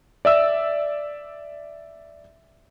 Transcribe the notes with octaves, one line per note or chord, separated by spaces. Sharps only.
D5 E5 E6